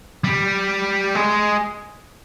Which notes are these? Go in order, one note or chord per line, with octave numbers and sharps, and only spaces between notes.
G3
G#3